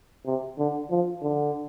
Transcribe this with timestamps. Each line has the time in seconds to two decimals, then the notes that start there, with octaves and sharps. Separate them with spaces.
0.26 C3
0.58 D3
0.90 F3
1.22 D3